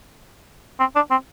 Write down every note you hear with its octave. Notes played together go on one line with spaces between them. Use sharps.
C4
D4
C4